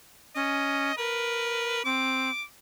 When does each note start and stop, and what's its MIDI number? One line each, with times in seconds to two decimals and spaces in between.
0.35 0.92 61
0.35 0.96 75
0.97 1.81 70
0.97 1.82 71
1.85 2.30 60
1.85 2.43 86